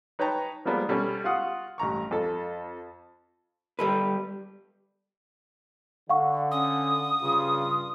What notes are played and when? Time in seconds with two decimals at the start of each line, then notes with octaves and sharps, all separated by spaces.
0.19 D#4 B4 C#5 G5 A5 A#5
0.65 F3 G3 G#3 A#3 B3 D4
0.89 B2 G3 C#4 A4
1.24 F4 F#4 F5 F#5 D#6
1.78 A1 G2 A#5 C#6
2.11 F2 A4
3.79 G3 A4 B4
6.10 D3 F5 F#5 C#6
6.51 C#4 D#6
7.21 G2 C#3 F4